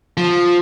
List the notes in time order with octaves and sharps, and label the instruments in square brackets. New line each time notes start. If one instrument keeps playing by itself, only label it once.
[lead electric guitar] F3